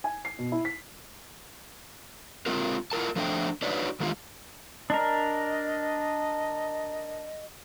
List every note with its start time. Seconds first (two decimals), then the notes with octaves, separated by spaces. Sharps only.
0.04 G#5
0.25 C7
0.39 B2
0.52 E4
0.65 B6
2.46 G#3 C4 F4 A#4
2.92 E4 F4 A#4 A5
3.16 F3 A3 D4 C5 G5
3.62 D4 D#4 F#4 B4 C#5 D5
4.00 D#3 E3 G#3 F4
4.90 D4 A#4 D#5